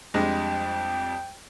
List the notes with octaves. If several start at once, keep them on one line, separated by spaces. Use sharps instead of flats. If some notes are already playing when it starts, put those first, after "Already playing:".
F2 G3 G#3 D4 G5